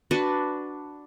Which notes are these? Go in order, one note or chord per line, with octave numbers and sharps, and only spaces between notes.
D4 F#4 B4